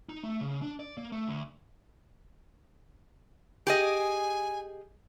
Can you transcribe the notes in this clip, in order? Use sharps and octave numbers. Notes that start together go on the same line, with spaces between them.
D#4
A3
C#3
D4
D5
A#3
A3
D2
G4 G#4 D#5 G#5